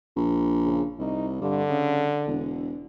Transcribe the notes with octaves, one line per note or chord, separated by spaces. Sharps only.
A#1
C#3
C2 D#4
G2 D3
C#3
E1